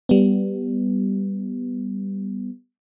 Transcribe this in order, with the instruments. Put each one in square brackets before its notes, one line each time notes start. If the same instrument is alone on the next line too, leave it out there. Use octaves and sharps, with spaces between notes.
[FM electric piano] G3 B3